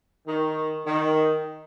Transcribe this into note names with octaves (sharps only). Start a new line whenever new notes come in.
D#3
D#3